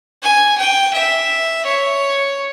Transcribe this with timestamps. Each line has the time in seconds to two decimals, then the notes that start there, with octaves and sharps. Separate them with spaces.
0.23 G#5
0.58 G5
0.94 E5
1.66 C#5